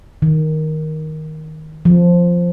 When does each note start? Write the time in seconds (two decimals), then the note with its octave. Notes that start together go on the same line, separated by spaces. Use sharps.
0.22 D#3
1.85 F3